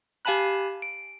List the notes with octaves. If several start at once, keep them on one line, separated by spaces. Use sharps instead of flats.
G4 F5 G#5 A5 B5 F#6
D7